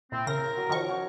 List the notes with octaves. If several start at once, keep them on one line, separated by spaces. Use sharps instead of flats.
A#2 C4 E4
C#3 A#4 C6 A#6
F#3 C6 D#6
D#3 F3 C#6
C#4 C#5 F#5